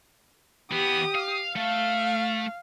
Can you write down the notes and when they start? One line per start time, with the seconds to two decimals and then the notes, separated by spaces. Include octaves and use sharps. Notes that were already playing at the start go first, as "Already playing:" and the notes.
0.72 E3 B3 G4 D#6
1.15 F5
1.56 A3 F5